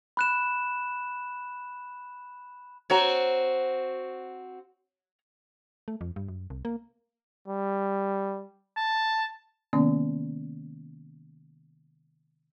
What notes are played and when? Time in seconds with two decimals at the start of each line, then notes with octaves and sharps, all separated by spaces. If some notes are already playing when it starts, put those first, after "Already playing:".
0.17 B5 F#6 E7
2.90 C4 F#4 C#5 A#5
5.88 A3
6.01 F2
6.16 G2
6.28 F#2
6.50 C2
6.65 A#3
7.48 G3
8.77 A5
9.73 C3 D#3 G#3 A#3 B3 C#4